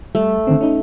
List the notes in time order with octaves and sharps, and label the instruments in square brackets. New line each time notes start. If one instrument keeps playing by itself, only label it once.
[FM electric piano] G3 [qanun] A3
[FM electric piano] D3 D#3 C4
C#4 D#4